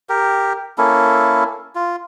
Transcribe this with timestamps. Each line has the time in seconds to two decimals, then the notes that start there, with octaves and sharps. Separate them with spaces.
0.09 G4 A#4
0.78 A#3 C#4 E4 A4
1.75 F4